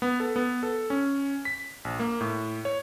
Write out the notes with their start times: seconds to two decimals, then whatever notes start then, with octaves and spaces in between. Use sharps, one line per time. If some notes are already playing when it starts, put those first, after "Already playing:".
0.02 B3
0.20 A4
0.36 B3
0.63 A4
0.90 C#4
1.45 B6
1.85 A#1
1.99 A#3
2.21 A2
2.65 C#5